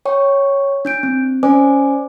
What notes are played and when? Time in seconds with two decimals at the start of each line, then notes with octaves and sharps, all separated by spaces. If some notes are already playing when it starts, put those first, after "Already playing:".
0.05 C#5 G5 C#6
0.85 D4 G6 D7
1.03 C4
1.43 C#4 C5 D5 G#5 D6